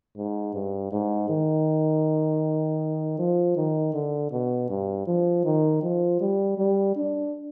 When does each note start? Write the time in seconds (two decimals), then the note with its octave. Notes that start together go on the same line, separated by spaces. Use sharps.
0.17 G#2
0.55 G2
0.92 G#2
1.30 D#3
3.19 F3
3.57 D#3
3.94 D3
4.32 B2
4.70 G2
5.07 F3
5.45 D#3
5.83 F3
6.21 G3
6.58 G3
6.96 D4